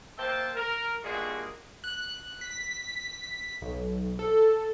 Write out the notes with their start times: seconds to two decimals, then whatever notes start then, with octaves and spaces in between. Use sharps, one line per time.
0.18 A#3 C5 E5 G5 A5
0.55 A#4
1.03 G2 A#2 G#3 A#3 F#4 G#4
1.84 F#6
2.41 B6
3.61 B1
4.19 A4